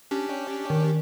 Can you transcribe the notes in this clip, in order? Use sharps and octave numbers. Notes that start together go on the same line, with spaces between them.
C#4 D4 G4
D#3